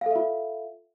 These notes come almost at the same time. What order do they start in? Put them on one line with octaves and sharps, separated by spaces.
F5 A4 E5 F4